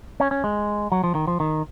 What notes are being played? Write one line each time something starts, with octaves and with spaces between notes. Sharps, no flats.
C#4
C#4
G#3
F#3
F3
D#3
F3
D#3